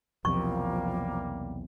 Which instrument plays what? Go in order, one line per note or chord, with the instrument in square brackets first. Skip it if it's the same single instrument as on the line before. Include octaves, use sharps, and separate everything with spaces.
[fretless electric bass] B1 E2 C3 [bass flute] F3 [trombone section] G3 A#3 [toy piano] C#6